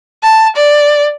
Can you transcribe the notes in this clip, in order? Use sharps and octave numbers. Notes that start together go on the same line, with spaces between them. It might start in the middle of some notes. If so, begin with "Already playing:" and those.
A5
D5